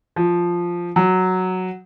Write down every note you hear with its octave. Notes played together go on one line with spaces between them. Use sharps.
F3
F#3